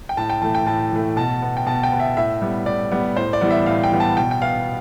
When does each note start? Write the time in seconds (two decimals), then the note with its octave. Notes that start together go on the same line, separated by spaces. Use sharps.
0.09 G5
0.17 A2 A5
0.30 G5
0.42 E3 A3 A5
0.55 G5
0.66 A2 A5
0.92 E3 A3
1.16 B2 A5
1.42 B3
1.57 G5
1.66 B2 A5
1.83 G5
1.92 B3
2.00 E5
2.17 A2 E5
2.42 G3 B3
2.66 A2 D5
2.92 G3 B3
3.17 A2 C5
3.33 D5
3.41 E3 G3 B3
3.51 E5
3.66 A2 F5
3.83 G5
3.92 E3 G3 B3
4.00 A5
4.17 B2 G5
4.31 G5
4.42 B3 F5